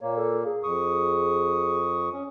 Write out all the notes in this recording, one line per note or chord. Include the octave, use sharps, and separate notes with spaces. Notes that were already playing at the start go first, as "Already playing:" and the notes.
A#2 A#3 C#5
A4
G#4
F2 C#6 D#6
C#4